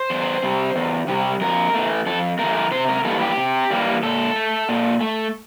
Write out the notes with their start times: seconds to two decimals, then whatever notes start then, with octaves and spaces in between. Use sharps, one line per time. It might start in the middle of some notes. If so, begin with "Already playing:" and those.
Already playing: C5
0.10 E2
0.42 C3 G3
0.76 E2
1.08 C3 G3
1.41 F2 A#4
1.74 E3 A3
2.06 F2 A4
2.39 E3 A3 A#4
2.55 A#4
2.71 C3 C5
2.88 A#4
3.05 E3 G3 A#3 A4
3.21 G4
3.37 C3
3.70 E3 G3 A#3
4.03 A#2 A4
4.36 A3
4.69 A#2
5.01 A3